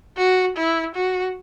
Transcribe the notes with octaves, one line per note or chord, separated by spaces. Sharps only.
F#4
E4
F#4